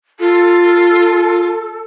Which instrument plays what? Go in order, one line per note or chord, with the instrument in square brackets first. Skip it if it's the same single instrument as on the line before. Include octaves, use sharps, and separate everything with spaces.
[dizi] F4 [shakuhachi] A4